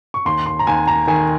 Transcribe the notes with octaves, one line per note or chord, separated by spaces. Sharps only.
C#6
D#2 C6
C6
A#5
D#2 G#5
A#5
D#3 G#5